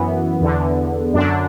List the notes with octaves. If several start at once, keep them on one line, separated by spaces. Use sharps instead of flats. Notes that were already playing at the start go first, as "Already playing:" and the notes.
Already playing: F#2 E3 B3
E2 D3
F#2 D3 D4